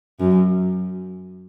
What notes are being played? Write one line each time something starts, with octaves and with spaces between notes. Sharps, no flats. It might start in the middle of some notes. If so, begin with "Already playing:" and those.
F#2